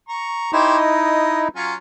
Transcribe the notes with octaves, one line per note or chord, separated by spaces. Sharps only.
A#5 C#6
D#4 E4 G4 C5 C#5
D#5
F#3 C#4 F4